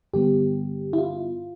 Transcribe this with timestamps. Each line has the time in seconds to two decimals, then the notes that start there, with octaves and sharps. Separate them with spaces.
0.13 G2 D3 G3 B3 G4
0.93 E4
0.98 F4